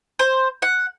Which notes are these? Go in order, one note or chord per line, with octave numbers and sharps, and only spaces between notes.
C5
F#5